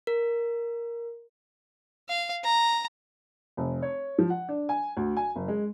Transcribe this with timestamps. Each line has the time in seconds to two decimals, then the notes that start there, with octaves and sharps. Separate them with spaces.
0.07 A#4
2.09 F5
2.44 A#5
3.57 F1
3.82 C#5
4.18 F3
4.30 F#5
4.49 D4
4.69 G#5
4.97 D2
5.17 G#5
5.35 F#1
5.48 G#3